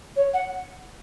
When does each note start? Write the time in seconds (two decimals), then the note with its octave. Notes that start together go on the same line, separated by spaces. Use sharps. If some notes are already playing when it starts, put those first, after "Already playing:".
0.16 C#5
0.33 F#5